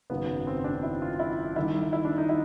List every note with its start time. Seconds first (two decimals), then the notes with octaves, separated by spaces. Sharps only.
0.10 G#1 F#2 C#3 F#3 B3
0.47 C4
0.64 D4
0.83 E4
1.02 F4
1.20 E4
1.56 D#2 D#3 G3 E4
1.93 E4
2.05 D4
2.18 D#4
2.29 E4